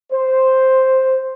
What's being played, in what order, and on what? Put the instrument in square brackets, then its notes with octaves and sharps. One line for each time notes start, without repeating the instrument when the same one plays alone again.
[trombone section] C5